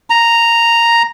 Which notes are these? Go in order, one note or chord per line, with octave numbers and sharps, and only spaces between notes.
A#5